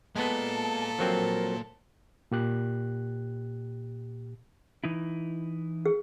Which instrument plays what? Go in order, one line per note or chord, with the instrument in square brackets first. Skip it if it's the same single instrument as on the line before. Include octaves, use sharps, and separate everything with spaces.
[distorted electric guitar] A#2 [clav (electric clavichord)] G#3 B3 [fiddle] A4 [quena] A5
[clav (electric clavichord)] F3 F#3 C4 [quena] A#4
[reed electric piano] A#2 G4 F#6
[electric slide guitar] E3 D#4 E4
[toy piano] G#4